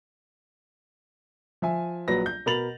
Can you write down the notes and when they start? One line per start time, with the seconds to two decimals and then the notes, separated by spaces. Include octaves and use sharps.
1.62 F3 E5 G#5
2.08 A#1 F#3 B4 A#6
2.26 G6
2.46 B2 A#4 B5 A6 F7 F#7